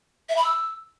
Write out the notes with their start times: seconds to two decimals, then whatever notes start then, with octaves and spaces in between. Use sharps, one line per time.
0.29 E5
0.37 B5
0.44 E6